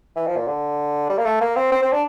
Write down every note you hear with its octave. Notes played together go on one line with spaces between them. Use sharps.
E3
F3
A#2
D3
G3
A#3
A3
A#3
C4
C4
C4
D4